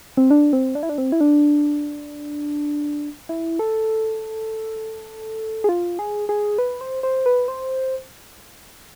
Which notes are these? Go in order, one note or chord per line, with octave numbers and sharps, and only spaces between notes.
C4
D4
C4
D4
E4
D4
C4
E4
D4
E4
A4
G#4
F4
G#4
G#4
B4
C5
C5
B4
C5